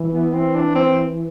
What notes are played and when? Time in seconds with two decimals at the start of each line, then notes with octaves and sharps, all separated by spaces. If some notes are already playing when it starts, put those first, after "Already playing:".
Already playing: E3
0.12 B3
0.33 C4
0.55 D4
0.75 C4